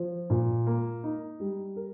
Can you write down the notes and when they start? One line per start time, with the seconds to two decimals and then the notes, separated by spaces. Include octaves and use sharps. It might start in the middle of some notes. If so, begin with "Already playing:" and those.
Already playing: F3
0.30 A#2
0.67 A#3
1.03 D#4
1.40 G3
1.76 A#4